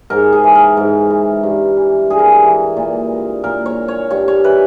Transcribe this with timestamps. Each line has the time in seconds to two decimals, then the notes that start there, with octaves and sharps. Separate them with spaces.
0.10 G#2 A#4
0.33 G#4
0.44 E3
0.55 A#4
0.77 G#2
1.11 E3
1.43 G2
1.77 E3
2.10 G2 G#4
2.19 A#4
2.28 G#4
2.44 E3
2.77 A#2
3.44 A#2 A#4
3.66 C#5
3.88 C#5
4.11 G2 C#5
4.28 C#5
4.44 E3 B4